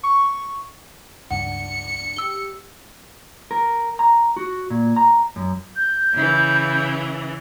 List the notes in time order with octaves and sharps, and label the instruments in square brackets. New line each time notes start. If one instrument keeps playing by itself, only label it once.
[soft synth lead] C#6
[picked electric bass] C#2 G2 [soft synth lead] D4 [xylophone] F#5 [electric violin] C#7
[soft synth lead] G4 [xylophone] E6 G7
[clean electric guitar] A#4
A#5
F#4
A#2
A#5
F#2
[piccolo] G6
[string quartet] C#3 E3